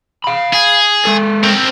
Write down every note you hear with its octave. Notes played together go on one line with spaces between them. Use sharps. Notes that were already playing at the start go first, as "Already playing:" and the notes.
F5 B5
G#4
G#3 A4
C4 A#4